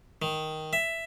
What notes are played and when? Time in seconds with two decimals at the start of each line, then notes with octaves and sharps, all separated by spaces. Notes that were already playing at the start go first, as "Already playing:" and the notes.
0.22 D#3
0.73 E5